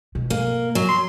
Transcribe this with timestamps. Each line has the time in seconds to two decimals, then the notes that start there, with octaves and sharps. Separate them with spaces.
0.15 B2
0.30 A#3
0.75 F#3
0.89 C6